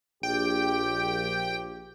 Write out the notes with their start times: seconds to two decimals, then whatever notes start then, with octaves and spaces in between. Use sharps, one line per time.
0.23 A#1 G4 G5